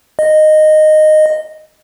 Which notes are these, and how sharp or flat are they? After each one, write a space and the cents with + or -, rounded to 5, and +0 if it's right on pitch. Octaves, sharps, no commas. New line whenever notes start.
D#5 -10